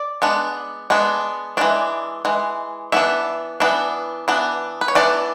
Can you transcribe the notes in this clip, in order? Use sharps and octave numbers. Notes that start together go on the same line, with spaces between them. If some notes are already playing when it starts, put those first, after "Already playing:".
Already playing: D5
G#3 B3 D4
G#3 B3 D4
E3 G#3 D4 D5
E3 G#3
E3 B3 D4 E5
E3 B3 D4
E3 B3 D4
B4
C#5
E3 B3 D4 D5